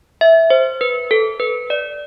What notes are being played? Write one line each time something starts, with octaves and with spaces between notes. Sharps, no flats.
E5
C5
B4
A4
B4
D5